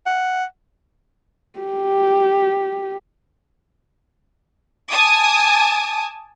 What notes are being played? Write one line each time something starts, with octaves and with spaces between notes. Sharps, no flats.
F#5
G4
G#5 A5 D6 D#6